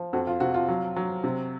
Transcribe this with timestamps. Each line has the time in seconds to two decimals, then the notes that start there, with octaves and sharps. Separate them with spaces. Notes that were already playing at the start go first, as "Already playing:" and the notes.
Already playing: F3
0.13 F2 F#4
0.27 F4
0.40 C3 F#4
0.54 F4
0.68 F#3
0.96 F#3
1.24 C3